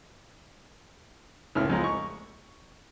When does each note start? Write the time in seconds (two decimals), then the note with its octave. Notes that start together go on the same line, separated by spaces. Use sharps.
1.55 C#2 A2 F6
1.70 F2 G#3 A#5
1.84 C#6